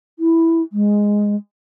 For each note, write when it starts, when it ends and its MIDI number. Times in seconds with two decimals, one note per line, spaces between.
0.19 0.62 64
0.72 1.35 56